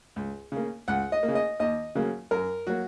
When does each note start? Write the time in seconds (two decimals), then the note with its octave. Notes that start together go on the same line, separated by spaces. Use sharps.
0.16 C#2
0.52 C#3 A#3
0.88 C#2 F#5
1.12 D#5
1.23 A#3
1.28 C#3
1.35 D#5
1.60 D#2 D#5
1.95 C#3 F#3 A#3
2.31 F#2 A#4
2.67 F#3 A#3 F#4